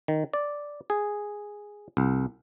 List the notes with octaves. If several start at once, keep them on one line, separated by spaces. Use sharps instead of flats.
D#3
D5
G#4
C2